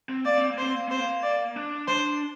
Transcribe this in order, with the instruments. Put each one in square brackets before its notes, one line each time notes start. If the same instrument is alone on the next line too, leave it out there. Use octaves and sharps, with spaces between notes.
[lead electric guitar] C4
[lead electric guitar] A#3 [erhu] D5
[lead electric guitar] C4
A#3
[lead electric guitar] C4 [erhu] C5
[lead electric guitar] A#3
[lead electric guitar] C4 [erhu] C5
[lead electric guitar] A#3
[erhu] D5
[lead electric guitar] D4
[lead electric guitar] D4 [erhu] C5